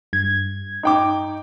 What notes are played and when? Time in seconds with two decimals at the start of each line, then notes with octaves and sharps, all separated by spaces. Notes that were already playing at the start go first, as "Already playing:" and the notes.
0.13 G2 G#6
0.83 D#4 G5 D6